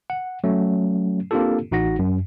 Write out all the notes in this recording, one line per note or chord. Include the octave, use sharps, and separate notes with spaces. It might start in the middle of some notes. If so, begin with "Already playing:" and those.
F#5
F#3 A3 C#4
A#3 C4 D4 F4 G4 A4
A1 D#4 F#4 F#5 A#6
F#2